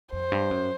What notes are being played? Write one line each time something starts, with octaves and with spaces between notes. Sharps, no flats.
F2 C5
G2
F#2